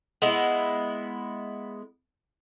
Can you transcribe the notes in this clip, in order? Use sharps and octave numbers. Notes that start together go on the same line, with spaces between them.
G#3 B3 E4